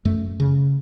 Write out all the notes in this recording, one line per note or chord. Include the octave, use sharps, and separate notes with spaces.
F#2 A3
C#3